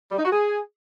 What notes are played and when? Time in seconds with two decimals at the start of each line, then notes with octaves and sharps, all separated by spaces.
0.11 G3
0.18 D#4
0.25 F#4
0.32 G#4